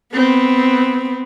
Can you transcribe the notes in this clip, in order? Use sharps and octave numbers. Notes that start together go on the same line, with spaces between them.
B3 C4